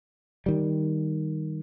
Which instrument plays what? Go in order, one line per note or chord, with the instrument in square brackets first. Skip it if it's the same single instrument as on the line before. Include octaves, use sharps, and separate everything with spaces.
[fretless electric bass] D#3 G3